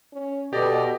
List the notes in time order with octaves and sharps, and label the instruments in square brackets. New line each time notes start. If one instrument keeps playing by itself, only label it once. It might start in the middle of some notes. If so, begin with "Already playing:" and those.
[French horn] C#4
[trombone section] B2 [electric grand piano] G4 [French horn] A4 [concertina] D5 D#5